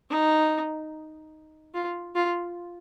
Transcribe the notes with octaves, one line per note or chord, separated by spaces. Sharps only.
D#4
F4
F4